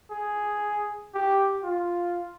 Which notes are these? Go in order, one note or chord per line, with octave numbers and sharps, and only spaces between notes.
G#4
G4
F4